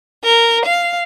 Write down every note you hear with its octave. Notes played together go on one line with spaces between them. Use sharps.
A#4
F5